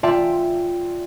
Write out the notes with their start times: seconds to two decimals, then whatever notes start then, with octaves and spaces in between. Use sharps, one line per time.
0.03 F4 D5 E5 G5 A5